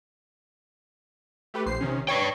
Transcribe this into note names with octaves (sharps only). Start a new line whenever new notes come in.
A3 G4 B4
A#1 C5 C7
C3 D#3 C#4
B4 C#5 D5 G5